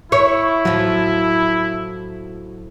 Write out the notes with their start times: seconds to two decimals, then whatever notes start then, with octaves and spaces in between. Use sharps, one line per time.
0.12 E4 C#5 E5
0.65 A2 F3 F#3